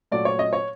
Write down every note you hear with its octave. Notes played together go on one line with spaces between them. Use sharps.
A#2 F#3 A3 D5
C#5
D#5
C#5